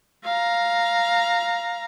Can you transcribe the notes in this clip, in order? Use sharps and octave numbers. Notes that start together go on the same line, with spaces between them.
F5 A#5